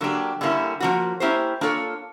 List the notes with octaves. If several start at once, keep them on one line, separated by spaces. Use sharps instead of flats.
D3 F#3 A#3 D4 G4
D3 G3 A#3 C#4 E4
F3 A#3 C#4 F#4
A#3 C#4 E4 G4 C5
A#3 D4 F4 A4 C#5